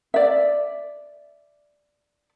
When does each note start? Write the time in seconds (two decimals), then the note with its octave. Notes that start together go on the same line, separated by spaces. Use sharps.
0.14 D5 E5